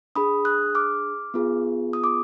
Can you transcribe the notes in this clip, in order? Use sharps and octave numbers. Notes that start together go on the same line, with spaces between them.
D4 G#4 B5 D#6
D#6 F#6
D6 F6
B3 F4 G#4
D#6
D6